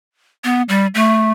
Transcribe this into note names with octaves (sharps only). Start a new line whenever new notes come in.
B3
G3
A3